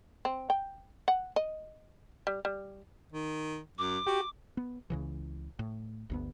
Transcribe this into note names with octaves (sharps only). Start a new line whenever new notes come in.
C4
G5
F#5
D#5
G3
G3
D#3
F#2 D6
F#4 G4
B3
C#2 C#3 E3
A2
G1 D2 B3